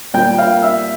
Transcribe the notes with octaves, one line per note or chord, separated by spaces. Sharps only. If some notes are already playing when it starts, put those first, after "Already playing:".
A#2 G3 G5 G6
F5 F6
E5 E6